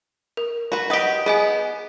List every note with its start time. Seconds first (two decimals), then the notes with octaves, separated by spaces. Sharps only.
0.37 A#4
0.72 F#4 B4
0.90 G4 B4 D#5 F#5 D#6
1.26 B3 G#4 D#5 G#5